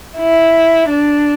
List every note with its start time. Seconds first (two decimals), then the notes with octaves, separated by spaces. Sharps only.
0.17 E4
0.88 D4